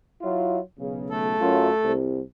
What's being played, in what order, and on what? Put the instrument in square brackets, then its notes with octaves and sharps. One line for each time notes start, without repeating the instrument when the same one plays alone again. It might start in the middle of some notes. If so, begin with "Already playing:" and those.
[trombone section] F#3 E4 F4
B1 C#3
[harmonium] A3 A4
[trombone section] F#2 F4
C2